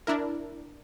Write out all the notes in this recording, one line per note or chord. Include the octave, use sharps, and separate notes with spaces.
D4 E4 A#4